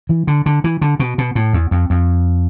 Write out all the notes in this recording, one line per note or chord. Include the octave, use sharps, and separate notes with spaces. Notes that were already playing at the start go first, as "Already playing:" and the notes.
E3
D3
D3
E3
D3
B2
B2
A2
E2
F2
F2